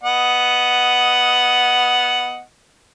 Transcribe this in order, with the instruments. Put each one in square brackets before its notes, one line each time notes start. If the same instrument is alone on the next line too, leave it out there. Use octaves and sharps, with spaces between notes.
[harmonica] B3 D#5 F#5